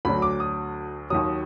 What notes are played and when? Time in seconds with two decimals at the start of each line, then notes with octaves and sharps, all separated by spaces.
0.05 D2 D3 F#3 B5
0.22 D6
0.40 D#6
1.10 D#2 D#3 F#3 D#6